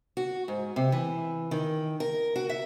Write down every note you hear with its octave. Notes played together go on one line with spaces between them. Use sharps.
F#4
G#2
C3
E3
D#3
A#4
F#4
E5